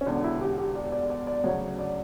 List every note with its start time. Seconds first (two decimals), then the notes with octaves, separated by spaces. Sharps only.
0.01 C#4
0.06 E1 E2 D3 D4
0.24 E4
0.41 G4
0.58 G4
0.75 D5
0.92 D5
1.10 D5
1.27 D5
1.44 D2 C#3 F#3 C#5
1.79 D5